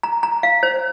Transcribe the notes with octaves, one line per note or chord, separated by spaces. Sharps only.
A#5
A#5
F5
C5